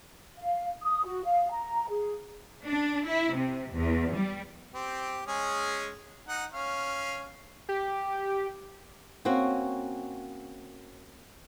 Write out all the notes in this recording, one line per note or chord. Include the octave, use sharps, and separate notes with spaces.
F5
D#6
F#4
F5
A#5
G#4
D4
E4
C3
E2
G3
C4 G4
G#3 C#4 G#4
D#4 F#5
C#4 C#5 F5
G4
A#3 C4 C#4 F#4